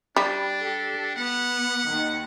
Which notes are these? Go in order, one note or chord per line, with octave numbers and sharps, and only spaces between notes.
G3 D4
G4 A4
B3 F#5
D#2 D#3